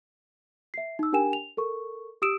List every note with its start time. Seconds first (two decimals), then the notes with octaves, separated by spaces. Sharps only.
0.74 E5 C7
0.99 D#4 E6
1.13 D4 G4 A#4 G5 G#5 E7
1.33 F7
1.57 A4 A#4 C#6
2.22 G4 D#6 E6 D7 E7